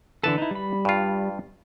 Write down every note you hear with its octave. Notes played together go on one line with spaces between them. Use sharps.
D3 E3 A4 B4 A5
D#4 E4
G3 B5
G2 F4